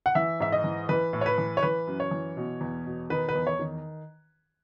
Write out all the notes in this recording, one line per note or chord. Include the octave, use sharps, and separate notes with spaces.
F#5
E3 E5
G#2 E5
D#5
E3
E3 B4
A2
C#5
B4
E3
C#5
E3 B4
F#2
C#5
E3
B2
E2
B2
D#3 B4
B4
E2
C#5
D#3